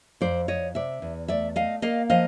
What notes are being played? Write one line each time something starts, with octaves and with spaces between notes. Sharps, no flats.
F2 C5 D5
F2 C#5 D#5
C3 D5 E5
E2
A3 D5 E5
A3 D#5 F5
A#3 D#5 F5
F3 D#5 F5